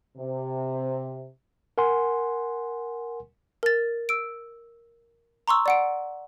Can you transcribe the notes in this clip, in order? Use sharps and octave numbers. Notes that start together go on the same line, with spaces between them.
C3
A#4 F#5 G#5 C6
A#4 A6
E6 D7
A#5 C6 C#6 E6
D5 F#5 D7